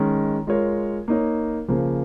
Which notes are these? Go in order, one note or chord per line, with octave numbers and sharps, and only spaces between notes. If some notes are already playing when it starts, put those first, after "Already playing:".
Already playing: D#3 G#3 C#4
G#3 F4 A#4 C#5
A#3 D#4 C#5
C#3 F3 A#3